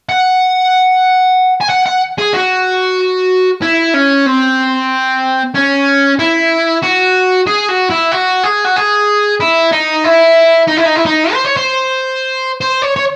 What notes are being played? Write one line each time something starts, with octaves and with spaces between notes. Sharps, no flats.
F#5
G#5
F#5
F#5
G#4
F#4
E4
C#4
C4
C#4
E4
F#4
G#4
F#4
E4
F#4
G#4
F#4
G#4
E4
D#4
E4
D#4
E4
D#4
E4
D#4
C5
C#5
C5
C5
C#5
C#5